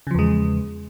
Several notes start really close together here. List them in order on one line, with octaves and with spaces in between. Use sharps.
C#3 F3 E2 G#3